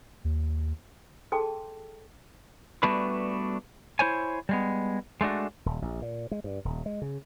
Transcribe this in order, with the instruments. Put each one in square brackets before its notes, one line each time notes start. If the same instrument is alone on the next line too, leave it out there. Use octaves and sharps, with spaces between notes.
[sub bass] D#2
[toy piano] G#4 A4 G5 A5 C6 D6
[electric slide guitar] G3 A3 B3 D4 F#4 B4
E4 C5 C#5 G#5
G3 G#3 B3
G#3 A3 D4 F#4
[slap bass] D#1
A#1
A#2
G#3
G2
D#1
G#3
C#3